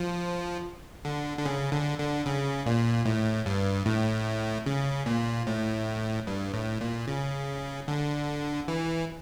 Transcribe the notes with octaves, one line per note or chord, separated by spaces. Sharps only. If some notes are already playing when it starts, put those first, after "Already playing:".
Already playing: F3
D3
D3
C#3
D3
D3
C#3
A#2
A2
G2
A2
C#3
A#2
A2
G2
A2
A#2
C#3
D3
E3